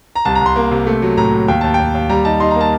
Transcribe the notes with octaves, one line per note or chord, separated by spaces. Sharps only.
A#5
C2 A5
A#5
C2
C6
A#3
C3
A3
F#3
A2 A#5
F#3
D#2 G5
D#2 A5
D#2 G5
D#2
G3 A#5
D#4 A5
D#4 C6
A#5
A#3
A5